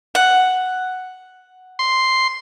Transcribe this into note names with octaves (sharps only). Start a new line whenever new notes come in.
F#5
C6